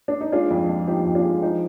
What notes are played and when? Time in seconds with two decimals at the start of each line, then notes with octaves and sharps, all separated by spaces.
0.08 D4
0.21 D#4
0.32 G#3 D4 F4
0.51 F2
0.69 F2
0.87 F3 D#4 G4
1.05 F2
1.15 D4 F4
1.24 G#3
1.42 F3 D#4